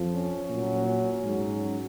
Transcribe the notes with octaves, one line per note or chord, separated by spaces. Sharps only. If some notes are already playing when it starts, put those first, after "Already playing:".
Already playing: F2 F3
C#4
A#2 F#3
C#4
G#2 F#3